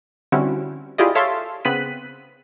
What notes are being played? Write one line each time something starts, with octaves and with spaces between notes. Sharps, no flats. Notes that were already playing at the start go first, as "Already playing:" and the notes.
D3 G3 C4 C#4 E4 F#4
E4 F4 G4 G#4 D5 D#5
A4 C#5 E5 F5 A5 C6
C#3 B3 C4 F#6 B6 D#7